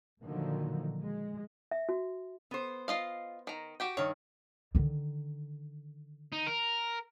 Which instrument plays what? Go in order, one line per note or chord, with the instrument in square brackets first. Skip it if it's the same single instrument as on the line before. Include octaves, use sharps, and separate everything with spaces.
[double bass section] A#2 D3 D#3 F3 F#3
G#3
[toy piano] E5
F#4
[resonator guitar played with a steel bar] B3 C5
[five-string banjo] F4 D#5 F5
D#3 A#5
F#4 G4 G5
[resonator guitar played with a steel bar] G2 D#3 [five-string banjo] C#5
[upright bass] D3 D#3
[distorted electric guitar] D#4
A#4